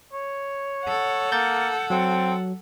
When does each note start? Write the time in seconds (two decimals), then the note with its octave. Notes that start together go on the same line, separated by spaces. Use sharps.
0.13 C#5
0.84 A4 F#5
1.32 A#3 G6 A6
1.90 F#3 C4